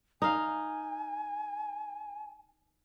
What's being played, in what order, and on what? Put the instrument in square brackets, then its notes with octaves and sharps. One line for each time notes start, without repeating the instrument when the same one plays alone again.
[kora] D#4 F5 [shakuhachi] G#5